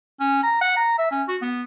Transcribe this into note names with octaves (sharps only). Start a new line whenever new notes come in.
C#4
A#5
F#5
A#5
E5
C#4
F#4
B3